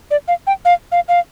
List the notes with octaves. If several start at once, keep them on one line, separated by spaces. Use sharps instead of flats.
D5
F5
G5
F5
F5
F5